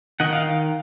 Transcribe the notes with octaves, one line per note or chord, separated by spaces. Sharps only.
D#3 D#5 F#5
F5